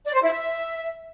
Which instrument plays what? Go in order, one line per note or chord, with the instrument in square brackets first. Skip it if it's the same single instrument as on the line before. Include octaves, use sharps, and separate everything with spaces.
[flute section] D5
C5
E4
E5